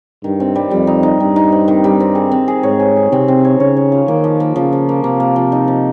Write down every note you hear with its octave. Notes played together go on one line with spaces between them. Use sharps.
G2 D#3
C4
G3
F2 G3
D#4
D#4
G2 C4
D#4
C4
D#3
G3
C4
G#4
C4
G#4
G#2 C#5
G#4
G#4
C3 C4
C4
C#5
C#3 C#5
C#5
F4
D#3 A#3
F3
A#3
C#3 F3
F3
A#3
C3 A#3
A#3
F3
D#4
F3